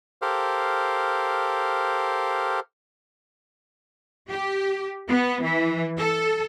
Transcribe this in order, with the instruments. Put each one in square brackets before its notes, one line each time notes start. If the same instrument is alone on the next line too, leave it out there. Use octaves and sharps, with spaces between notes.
[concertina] G4 A4 A#4 C5 F5
[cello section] G4
B3
E3
A4